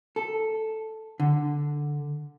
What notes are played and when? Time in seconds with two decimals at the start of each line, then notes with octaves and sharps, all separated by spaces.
0.16 A4
1.20 D3